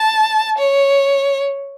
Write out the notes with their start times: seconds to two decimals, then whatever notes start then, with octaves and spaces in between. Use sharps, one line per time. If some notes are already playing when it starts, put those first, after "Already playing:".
Already playing: A5
0.58 C#5